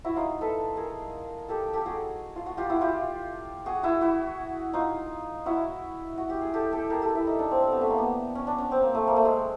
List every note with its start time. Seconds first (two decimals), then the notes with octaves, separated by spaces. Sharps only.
0.05 E4 F#4
0.16 D#4 F4
0.41 A4 B4
0.77 G#4 A#4
1.49 G4 A4
1.73 G4 A4
1.86 F#4 G#4
2.36 F4
2.46 F#4
2.57 F4 G4
2.69 E4 F#4
2.81 F4 G4
3.66 F#4 G#4
3.83 E4 F#4
4.01 E4 F#4
4.73 D#4 F4
5.46 E4 F#4
6.18 F#4
6.30 G4
6.41 G#4
6.54 G4 A4
6.73 G4 A4
6.90 G#4 A#4
7.02 G4 A4
7.15 E4
7.27 D#4
7.39 D4
7.51 C4
7.62 C4
7.72 B3
7.81 A3
7.90 A#3
7.98 B3
8.35 C#4
8.47 D4
8.58 C#4
8.71 C4
8.83 A#3
8.95 A3
9.07 A#3
9.16 A3
9.25 G#3